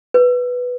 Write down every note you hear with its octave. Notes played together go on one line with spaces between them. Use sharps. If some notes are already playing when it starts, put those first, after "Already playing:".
B4